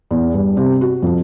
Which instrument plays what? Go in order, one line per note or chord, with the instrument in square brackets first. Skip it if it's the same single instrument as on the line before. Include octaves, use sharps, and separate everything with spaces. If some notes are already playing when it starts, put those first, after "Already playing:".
[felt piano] E2
G2
C3
F#4
F2